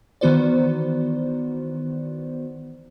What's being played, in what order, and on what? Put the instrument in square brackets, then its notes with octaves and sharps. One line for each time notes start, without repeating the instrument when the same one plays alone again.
[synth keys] D#3 E3 B3 F#4 C5 D5